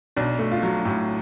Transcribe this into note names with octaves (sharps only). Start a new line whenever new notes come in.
B1 D4
A3
F4
F#3
A2